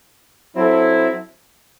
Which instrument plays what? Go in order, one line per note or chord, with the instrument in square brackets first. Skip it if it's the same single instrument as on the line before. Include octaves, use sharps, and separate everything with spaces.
[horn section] F#3 C4 E4 A4